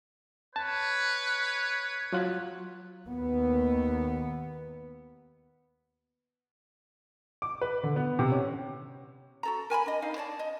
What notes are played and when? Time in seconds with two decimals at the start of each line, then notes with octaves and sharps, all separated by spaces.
0.56 B4 C#5 A5
2.13 F#3 F4 F#6
3.07 D#2 B3
7.42 D6
7.61 B4
7.83 D3
7.96 B3
8.19 C3
8.32 C#4
9.43 F#4 A4 A#5
9.70 A#4 G#5 A5 B5
9.86 D4 D#5
10.02 D#4 F5
10.16 C#5 D5 A5
10.39 D#5